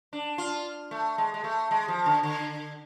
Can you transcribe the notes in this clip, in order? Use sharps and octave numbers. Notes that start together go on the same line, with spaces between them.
D4
F4
A3
G#3
G#3
A3
G#3
F3
D3
D3